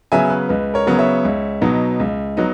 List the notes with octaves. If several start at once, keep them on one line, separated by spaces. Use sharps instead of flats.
C#3 F#3 B3 E5 G#5
B4
C#2 B4
A#4 C#5
C#3 F#3 B3
C#5 E5
C#2
B2 F#3 B3 D#4
C#2
F#3 B3 D#4